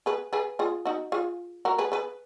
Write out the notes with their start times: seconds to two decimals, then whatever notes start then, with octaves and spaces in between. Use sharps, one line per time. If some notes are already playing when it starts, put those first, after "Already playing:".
0.06 G#4 B4
0.33 G#4 B4
0.59 F4 G#4
0.85 D#4 F#4
1.12 F4 G#4
1.65 F#4 A#4
1.78 G#4 B4
1.92 G#4 B4